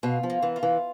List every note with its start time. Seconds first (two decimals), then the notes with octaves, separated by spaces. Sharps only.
0.03 B2 F4
0.23 F3
0.30 A#3
0.42 E3
0.56 F4
0.63 E3